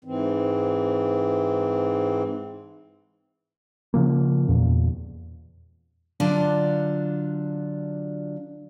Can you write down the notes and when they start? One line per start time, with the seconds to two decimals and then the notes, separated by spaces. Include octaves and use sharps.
0.05 G#2 E3 C4
3.94 C#3 F3 A#3
4.49 E2 A#2
6.20 D3 F#3 D4 F4